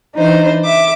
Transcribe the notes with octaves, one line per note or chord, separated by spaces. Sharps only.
E3 D4 D#4 C5
E5 D6